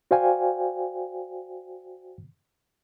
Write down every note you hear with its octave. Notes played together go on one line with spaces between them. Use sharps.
F#4 C5 D5 F5 G5 G#5